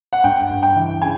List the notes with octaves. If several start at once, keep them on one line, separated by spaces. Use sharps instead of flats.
F#5
G2 G5
G2
G5
E3
C#3 G#5